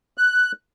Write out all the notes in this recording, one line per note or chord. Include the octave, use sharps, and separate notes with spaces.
F#6